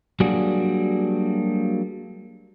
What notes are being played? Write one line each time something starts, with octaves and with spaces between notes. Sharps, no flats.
F#3 G3 A#3 D4 F#4 G#4